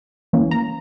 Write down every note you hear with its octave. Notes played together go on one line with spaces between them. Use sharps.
E3 A#3 C#4
A#5